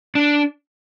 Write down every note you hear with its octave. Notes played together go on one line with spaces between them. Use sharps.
D4